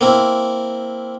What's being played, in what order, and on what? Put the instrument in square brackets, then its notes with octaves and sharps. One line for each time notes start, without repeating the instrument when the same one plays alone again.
[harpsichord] A#3 C4 E4